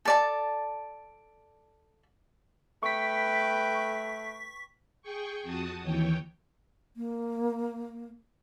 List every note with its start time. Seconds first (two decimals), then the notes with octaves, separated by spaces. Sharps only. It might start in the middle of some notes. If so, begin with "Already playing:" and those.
0.05 A4 D5 A5
2.83 A3 B4 G5 C#6 B6
5.02 G#4 G5 C#6
5.43 F2 F#4 A5 D#6
5.83 D#2 E3 C#5 G5
6.97 A#3